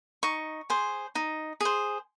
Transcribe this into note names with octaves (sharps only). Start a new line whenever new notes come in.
D#4 C#6
G#4 C5
D#4
G#4 C5